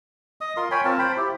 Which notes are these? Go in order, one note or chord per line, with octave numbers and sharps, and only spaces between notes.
D#5 D#6
F4 A#4 C6
C#5 G5 G#5 B5
C4 F4 A#4 A5
C5 G5 B5
E4 G4